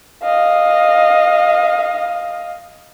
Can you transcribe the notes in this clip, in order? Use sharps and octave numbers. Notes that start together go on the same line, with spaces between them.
D#5 F5